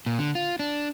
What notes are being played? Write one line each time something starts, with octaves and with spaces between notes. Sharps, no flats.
A#2
D3
F4
D4